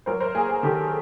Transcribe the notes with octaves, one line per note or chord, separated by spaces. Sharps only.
F#3 A#4 C5
A#4 C5
A#3 G#4
G#4
D#3 G4 A4